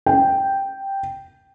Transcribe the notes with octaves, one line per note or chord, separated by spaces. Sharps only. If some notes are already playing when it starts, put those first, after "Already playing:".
G5